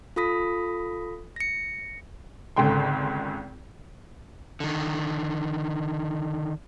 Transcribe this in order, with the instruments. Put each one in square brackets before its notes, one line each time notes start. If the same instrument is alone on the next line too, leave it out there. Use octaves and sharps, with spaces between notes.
[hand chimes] F4 A4 B5 D#6 A#6 B6
A#6 C#7
[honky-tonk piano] G#1 C#2 D3 G#3 G5 C6
[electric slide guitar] D3 D#3